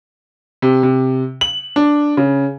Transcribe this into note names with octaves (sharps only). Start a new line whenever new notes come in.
C3
C3
F#7
D4
C#3